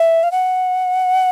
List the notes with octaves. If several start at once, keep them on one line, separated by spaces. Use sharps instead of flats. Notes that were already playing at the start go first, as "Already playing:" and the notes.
Already playing: E5
F5
F#5